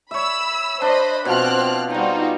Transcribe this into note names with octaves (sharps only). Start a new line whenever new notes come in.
C#5 E5 B5 E6
D4 C5 D#5 B5
B2 F3 C4 F4 F6 F#6
G3 D#4 F4 F#4 G5